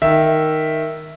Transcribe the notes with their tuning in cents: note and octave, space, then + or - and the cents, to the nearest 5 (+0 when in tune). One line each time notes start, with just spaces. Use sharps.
D#3 +0 E5 +0